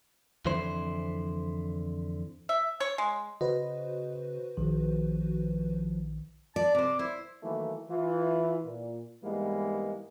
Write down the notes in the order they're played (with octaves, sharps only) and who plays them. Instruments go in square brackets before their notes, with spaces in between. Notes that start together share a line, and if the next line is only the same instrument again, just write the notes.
[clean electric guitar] F2 D3 E3 E4 C5
[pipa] E5
C#5
G#3
[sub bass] C#3 [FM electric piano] F#4 B4 C5 [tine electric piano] D#5
[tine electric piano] A#1 D#3 [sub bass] F3
[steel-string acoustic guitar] D5 [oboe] A5
[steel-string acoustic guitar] C3 C5 [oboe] D6
[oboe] E4 [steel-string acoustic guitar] C5
[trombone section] D#3 E3 F#3 A3 A#3
E3 F4
A#2
G#2 E3 G3 G#3 A#3 B3